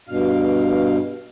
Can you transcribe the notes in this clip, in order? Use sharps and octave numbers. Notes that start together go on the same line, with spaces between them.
G2 B2 F5